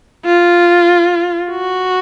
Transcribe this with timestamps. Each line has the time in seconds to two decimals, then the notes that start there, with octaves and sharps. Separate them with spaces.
0.25 F4
1.51 F#4